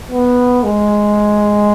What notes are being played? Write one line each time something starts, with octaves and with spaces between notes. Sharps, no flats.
B3
G#3